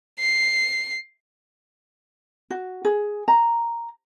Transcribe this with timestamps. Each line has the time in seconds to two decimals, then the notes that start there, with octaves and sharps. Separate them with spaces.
0.19 C7
2.50 F#4
2.85 G#4
3.28 A#5